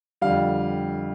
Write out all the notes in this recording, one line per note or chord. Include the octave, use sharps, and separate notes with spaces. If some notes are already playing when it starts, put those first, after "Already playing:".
F2 D3 G3 F5